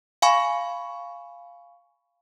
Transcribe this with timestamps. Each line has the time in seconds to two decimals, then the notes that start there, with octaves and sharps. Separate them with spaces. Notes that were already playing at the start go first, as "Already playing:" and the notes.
0.22 F5 G#5 B5 C#6